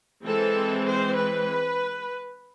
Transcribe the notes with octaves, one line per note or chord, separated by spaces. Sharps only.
E3 G#3 C4 A4
C5
B4